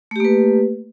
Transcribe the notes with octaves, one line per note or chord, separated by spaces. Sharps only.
A3 A#3 G4 B4